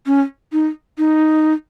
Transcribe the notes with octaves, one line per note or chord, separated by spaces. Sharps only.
C#4
D#4
D#4